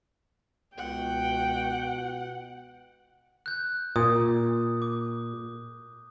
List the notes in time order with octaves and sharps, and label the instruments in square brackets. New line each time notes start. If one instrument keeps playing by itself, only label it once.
[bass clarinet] C#2 [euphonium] B2 [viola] F#5 [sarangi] G5
[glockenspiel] F#6 G6
[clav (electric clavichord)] A#2 [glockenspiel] D#6
[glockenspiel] D6